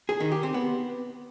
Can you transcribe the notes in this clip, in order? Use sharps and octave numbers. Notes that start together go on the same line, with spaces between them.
G#4
D#3
G4
C4
B3